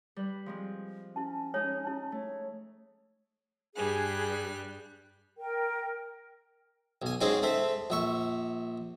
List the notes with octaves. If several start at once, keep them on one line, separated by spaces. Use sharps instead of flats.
G3 B4
F3 G#3 C4
C#4 E4 A5
G#3 D#4 C#5
E4 A5
A3 C#5
G2 G3 G#4 F#6
A#4 G5
B1 G#5
G#2 C4 C#4 D#4 G#4 G5
A3 C4 E5
A#1 E5 C#6